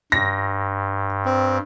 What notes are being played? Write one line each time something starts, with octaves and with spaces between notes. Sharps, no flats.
G2 A#6
C4